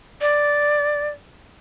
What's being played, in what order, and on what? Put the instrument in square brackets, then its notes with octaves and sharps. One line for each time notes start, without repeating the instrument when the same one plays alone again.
[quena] D5